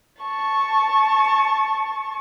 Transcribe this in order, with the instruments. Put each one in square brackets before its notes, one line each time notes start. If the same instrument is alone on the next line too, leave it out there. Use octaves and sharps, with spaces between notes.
[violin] A5 C#6